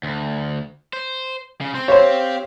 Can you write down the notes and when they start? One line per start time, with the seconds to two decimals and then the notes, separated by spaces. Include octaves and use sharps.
0.03 D2
0.93 C5
1.61 C#3
1.75 C4 C6
1.88 G4 C5 C#5 F5